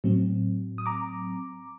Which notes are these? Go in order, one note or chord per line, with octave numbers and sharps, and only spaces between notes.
A2 F#3 C4
D#6
A#5 D6